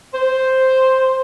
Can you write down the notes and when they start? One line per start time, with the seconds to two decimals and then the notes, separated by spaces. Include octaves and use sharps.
0.13 C5